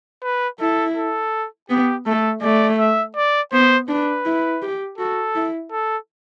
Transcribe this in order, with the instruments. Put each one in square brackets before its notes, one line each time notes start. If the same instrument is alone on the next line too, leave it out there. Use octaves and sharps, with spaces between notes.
[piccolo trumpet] B4
[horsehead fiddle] E4 [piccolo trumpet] A4
[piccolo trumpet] A4
[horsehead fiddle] B3 [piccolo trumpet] G4
[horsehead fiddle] A3 [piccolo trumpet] A4
[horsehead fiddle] A3 [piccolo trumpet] D5
[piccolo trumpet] E5
D5
[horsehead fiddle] B3 [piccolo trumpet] C5
[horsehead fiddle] D4 [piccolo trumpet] B4
[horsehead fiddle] E4
G4
[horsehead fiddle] F#4 [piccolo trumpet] A4
[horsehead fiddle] E4
[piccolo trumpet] A4